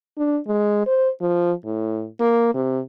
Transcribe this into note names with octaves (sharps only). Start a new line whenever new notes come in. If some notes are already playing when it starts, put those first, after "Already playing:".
D4
G#3
C5
F3
A2
A#3
C3